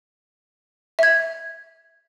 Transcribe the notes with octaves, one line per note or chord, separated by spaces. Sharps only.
E5 G#6